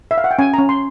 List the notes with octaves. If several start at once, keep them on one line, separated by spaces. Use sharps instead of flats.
E5
F5
F#5
G5
C#4 G#5
C#4 A#5
C6